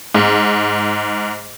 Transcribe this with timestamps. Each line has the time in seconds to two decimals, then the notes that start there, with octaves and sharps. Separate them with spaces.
0.15 G#2